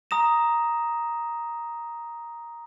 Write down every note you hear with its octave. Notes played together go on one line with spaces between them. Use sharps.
A#5 D#6 A#6 E7